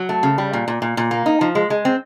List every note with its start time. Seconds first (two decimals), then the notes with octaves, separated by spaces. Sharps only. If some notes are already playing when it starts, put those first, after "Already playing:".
Already playing: F#3
0.09 A3
0.23 C#3
0.38 G3
0.53 A#2
0.68 A#2
0.82 A#2
0.97 A#2
1.11 A#3
1.26 D#4
1.41 F3
1.55 G#3
1.70 G#3
1.85 C4